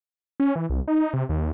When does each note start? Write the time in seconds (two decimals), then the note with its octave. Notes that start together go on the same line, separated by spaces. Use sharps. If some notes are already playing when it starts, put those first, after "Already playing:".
0.40 C#4
0.56 E3
0.70 C2
0.88 D#4
1.13 C3
1.29 D#2